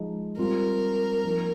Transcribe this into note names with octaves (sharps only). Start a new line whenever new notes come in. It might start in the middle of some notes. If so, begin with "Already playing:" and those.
Already playing: F3 G#3 D#4
G3 C4 F4 A#4
F3 A#3 D#4